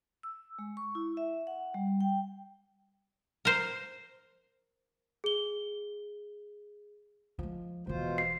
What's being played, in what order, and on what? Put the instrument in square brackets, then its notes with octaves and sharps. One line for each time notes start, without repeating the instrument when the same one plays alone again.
[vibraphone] E6
G#3
C#6
E4
E5
F#5
G3
G5
[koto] A#4 C5
[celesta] G#4 G7
[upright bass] F3 G#3
[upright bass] E1 E3 [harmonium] B2 F4 C5
[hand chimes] C7